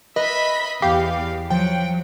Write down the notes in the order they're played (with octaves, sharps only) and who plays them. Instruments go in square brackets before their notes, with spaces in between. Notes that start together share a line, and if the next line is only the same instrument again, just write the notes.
[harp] B4 [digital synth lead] D#5 [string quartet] E5 B5
[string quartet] E2 [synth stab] G4 [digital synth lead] F5
[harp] F3 [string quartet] F#3 [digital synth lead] G5